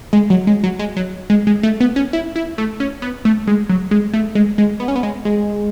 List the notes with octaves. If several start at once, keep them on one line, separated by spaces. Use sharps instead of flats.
G#3
F#3
G#3
F#3
G#3
F#3
G#3
G#3
A3
B3
C#4
E4
E4
A3
C#4
B3
A3
G#3
F#3
G#3
A3
G#3
G#3
B3
C#4
B3
G#3
G#3